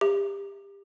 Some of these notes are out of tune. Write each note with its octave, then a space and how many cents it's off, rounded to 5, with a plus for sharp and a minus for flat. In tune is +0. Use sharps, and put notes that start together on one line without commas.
G4 +25